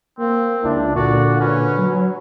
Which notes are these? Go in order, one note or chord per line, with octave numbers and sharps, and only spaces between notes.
A#3 C4
C#2 D4 E4
A#2 D3 F#4 D5
C#4 B4
F#3